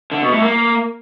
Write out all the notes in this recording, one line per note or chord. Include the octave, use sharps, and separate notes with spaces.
D3
B2
A2
A#3